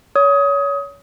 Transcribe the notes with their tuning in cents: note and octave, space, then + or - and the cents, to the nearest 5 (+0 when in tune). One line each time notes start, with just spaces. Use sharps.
C#5 +30 D#6 +25